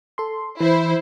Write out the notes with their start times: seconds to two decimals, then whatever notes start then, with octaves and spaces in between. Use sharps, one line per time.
0.18 A4 C6
0.61 E3 E4 C5